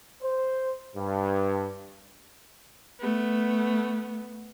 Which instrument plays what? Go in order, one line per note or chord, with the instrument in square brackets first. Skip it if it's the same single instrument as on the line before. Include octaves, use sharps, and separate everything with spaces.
[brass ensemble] C5
G2
[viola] A3 B3